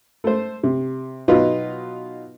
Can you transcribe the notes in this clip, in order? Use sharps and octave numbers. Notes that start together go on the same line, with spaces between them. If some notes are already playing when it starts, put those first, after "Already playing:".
A3 C5
C3
B2 F#3 D#4 F4 B4